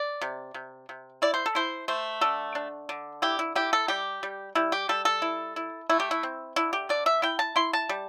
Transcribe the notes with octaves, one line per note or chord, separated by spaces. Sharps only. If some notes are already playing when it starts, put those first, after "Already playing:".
Already playing: D5
C3
C3
C3
E4 D5
C5
A4
E4 C5
A3 C5
D3 A4
D4
D3
E4 G4
E4
E4 G4
A4
G3 G4
G3
G3 E4
G4
G3 A4
A4
E4
E4
A3 E4
G4
E4
C4
D3 E4
G4
D3 D5
E5
E4 G5
A5
E4 C6
A5
G3